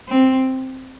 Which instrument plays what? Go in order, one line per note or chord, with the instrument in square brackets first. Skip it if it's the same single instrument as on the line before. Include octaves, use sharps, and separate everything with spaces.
[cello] C4